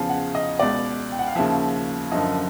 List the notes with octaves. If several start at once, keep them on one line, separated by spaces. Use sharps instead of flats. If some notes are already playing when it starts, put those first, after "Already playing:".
Already playing: E2 C#3 F3 F5
F#5
D#5
C#2 B2 D5
G5
F#5
F5
D#2 C#3 F3 E5
F#2 D3 F3 D#5